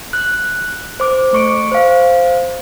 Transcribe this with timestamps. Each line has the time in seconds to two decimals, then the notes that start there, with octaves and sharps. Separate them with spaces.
0.13 F#6
1.00 C5 D6
1.33 A3 C#6 D7
1.72 C5 F5